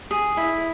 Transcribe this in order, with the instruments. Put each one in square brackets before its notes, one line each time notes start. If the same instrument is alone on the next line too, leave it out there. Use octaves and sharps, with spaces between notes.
[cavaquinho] G#4
E4